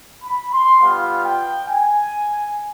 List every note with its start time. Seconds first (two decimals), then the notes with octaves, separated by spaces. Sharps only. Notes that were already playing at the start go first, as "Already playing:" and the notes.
0.23 B5
0.52 C6
0.81 G3 B3 F4 F5
1.24 G5
1.68 G#5